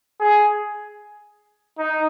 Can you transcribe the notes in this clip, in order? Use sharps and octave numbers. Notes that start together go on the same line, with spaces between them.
G#4
D#4